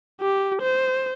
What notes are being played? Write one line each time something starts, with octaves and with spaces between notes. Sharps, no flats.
G4
C5